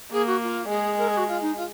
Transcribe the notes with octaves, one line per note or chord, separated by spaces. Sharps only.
A#3 G#4
F#4
F4
G#3 G#4
A#4
G#4
F#4
F4
D#4
F4